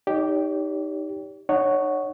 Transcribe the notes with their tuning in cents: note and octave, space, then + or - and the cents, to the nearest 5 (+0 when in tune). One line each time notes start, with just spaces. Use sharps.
D#4 +0 G4 +0 C#5 +40
D#4 -40 C#5 +0 F#5 +0